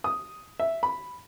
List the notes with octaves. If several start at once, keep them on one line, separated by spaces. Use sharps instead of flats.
D#6
E5
B5